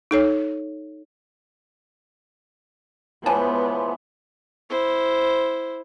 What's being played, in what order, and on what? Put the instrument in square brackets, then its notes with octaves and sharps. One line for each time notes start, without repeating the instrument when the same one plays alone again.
[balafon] D#4 A4 C#5
[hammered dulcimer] E3 F3 G#3 [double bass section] B3 [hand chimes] C#5 [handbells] G#5 A5
[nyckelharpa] E4 C5